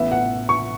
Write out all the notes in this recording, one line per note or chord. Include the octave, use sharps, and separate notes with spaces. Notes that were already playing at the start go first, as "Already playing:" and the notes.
Already playing: A1 A2 E3 B3 E5
F#5
C#6